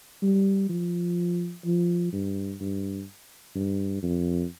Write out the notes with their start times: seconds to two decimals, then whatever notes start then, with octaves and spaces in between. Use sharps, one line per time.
0.23 G3
0.70 F3
1.65 F3
2.13 G2
2.60 G2
3.55 G2
4.03 F2